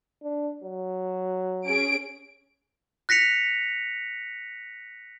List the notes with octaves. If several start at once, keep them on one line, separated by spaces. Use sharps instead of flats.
D4
F#3
C#4 G#4 D7
F#6 A#6 B6 C#7 F7